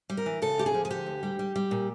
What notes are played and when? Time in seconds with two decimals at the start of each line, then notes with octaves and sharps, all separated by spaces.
0.10 G3
0.17 A#4
0.26 E3
0.42 C#3 A4
0.58 D2 G4
0.66 G#4
0.74 F3
0.85 G#4
0.90 D3 G4
1.07 D2
1.23 G3
1.39 G3
1.56 G3
1.71 A#2